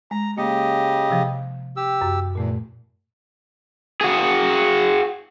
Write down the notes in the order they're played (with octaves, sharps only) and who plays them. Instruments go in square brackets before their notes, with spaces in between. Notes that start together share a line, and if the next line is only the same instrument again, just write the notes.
[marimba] G#3 [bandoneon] A#5
[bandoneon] C#3 G4 D#5 [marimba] A#3
[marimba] C3 F3
[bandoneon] G4 E6
[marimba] F#2
[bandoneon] E2 [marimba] A#2 A3
[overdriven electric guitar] F#4 G#4